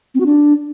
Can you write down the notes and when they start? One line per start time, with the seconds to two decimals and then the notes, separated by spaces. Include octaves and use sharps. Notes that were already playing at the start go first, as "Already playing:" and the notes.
0.14 C4
0.20 F#4
0.26 D4